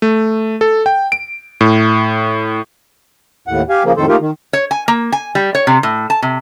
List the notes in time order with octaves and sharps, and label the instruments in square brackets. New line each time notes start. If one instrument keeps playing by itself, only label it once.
[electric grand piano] A3
A4
G5
D7
A2
[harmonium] D#2 A2 F#5
G4 F5 G#5
C#3 F3 A#3
F2 A2 D#3 A4 C5
A3 A#3 D#4 F4 G4 A#4
D#3
[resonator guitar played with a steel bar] C#5
G#5
A#3
G#5
G3
C#5
C3
A2
A5
C3